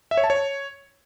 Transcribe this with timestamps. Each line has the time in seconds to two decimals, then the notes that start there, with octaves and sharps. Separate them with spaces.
0.11 E5
0.17 C#5
0.24 A5
0.30 C#5